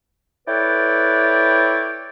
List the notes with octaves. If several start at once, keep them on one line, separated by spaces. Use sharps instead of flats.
E4 A4 B4 C#5 D5 G5